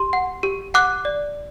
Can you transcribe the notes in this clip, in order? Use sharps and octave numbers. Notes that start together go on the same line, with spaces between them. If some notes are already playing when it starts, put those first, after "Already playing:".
Already playing: G4 C6
F#5
G4
F#5 D6 F#6
D5